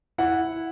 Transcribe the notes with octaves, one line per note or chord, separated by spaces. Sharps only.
E4 F#5